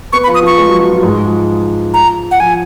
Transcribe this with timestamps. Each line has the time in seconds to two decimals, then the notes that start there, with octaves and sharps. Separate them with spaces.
0.13 B3 B4 C#6
0.24 B5
0.28 F3 F4
0.34 D#6
0.42 F3 F4 C#6
0.58 G#3 G#4
0.69 F#3 F#4
0.80 F#3 F#4
0.92 F3 F4
0.98 F#3
1.03 G#2 G#3
1.25 F3
1.94 A#5
2.31 F#5
2.40 F3 G#5